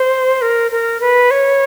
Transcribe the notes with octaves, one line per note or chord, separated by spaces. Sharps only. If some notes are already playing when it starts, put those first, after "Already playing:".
Already playing: C5
A#4
A#4
B4
C#5